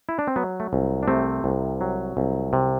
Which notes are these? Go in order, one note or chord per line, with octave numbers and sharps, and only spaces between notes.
E4
D4
C4
F#3 B3
A3
C2
D4
C3 A3 C4
C2
F#3
C2
C3